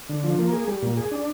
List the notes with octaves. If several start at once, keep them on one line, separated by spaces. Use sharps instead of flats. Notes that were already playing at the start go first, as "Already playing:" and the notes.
D3
F3
A#3
G#4
G3
A#2
G#4
D4